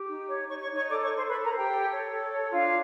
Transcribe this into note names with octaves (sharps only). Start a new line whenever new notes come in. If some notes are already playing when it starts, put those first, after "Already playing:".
Already playing: G4
D#4
C#5
D#4 C#5 C#6
C#5 C#6
D#4
C#5 C#6
A4 D5 D6
C#5 C#6
A4
C5 C6
A4 B4 B5
A#4 A#5
C5
G4 G5
A4
C#5
A4
C#5
D4 F4 F5